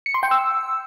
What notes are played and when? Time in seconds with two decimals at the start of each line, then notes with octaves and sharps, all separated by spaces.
0.06 C#7
0.14 C6
0.23 G5
0.31 E6